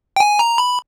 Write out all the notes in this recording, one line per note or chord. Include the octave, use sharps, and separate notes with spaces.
G5
G#5
A#5
B5